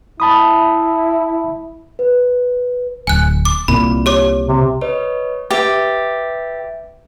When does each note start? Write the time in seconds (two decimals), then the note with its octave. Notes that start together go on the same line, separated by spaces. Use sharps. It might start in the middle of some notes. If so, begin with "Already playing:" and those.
0.20 E4 A5 B5 D#6
1.99 B4
3.07 D1 G#5 F#6
3.45 D6
3.68 C2 A#2 B5
4.06 G4 C#5 D6
4.48 C3
4.81 B4 C#5 D#5
5.51 G4 B4 E5 A6